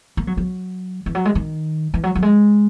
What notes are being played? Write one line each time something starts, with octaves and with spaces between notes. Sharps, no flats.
A#3
F#3
F#3
E3
F#3
G#3
D#3
E3
F#3
F#3
G#3